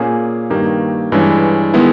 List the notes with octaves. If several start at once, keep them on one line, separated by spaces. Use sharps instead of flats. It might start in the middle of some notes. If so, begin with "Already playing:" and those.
Already playing: A#2 A#3 C#4 G#4
G2 D#3 A#3 D#4 G4
G2 E3 G#3 C#4
D#3 G#3 B3 E4